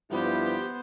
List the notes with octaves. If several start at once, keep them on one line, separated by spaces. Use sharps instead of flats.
G2 F3 B3 E4 G4 C5